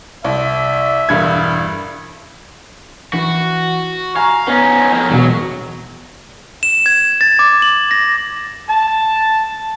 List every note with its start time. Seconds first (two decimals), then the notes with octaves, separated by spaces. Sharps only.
0.24 C2 E5
1.09 E1 G2 G#6
3.13 E3 F#4
4.16 F5 G#5 A#5
4.47 B3 C#4 D#4
4.92 F2 A#3
5.10 E1 B2 F#3
6.63 E7
6.86 G#6
7.21 A6
7.39 D6
7.62 F#7
7.91 A#6
8.69 A5